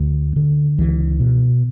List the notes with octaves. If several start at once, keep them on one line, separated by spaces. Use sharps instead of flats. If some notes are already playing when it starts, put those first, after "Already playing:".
Already playing: D2
D3
C#2 E3
B2